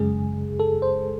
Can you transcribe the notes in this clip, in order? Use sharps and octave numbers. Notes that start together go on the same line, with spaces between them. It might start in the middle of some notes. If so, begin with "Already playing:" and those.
Already playing: F#2 C#3 G#3 G#4
A4
C5